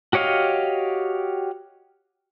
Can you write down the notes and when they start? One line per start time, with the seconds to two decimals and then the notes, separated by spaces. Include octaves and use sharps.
0.13 F#4 G4 C#5 D#5 F5